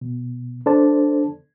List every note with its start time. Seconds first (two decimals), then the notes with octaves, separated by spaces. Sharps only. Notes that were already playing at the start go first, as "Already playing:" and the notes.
0.01 B2
0.66 D4 A4 C5 D5 A5